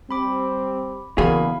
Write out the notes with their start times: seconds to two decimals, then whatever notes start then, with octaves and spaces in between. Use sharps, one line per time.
0.11 G3 C4 B5 D6
1.18 E2 C#3 E3 A#3 F#4 G#4 F5 B5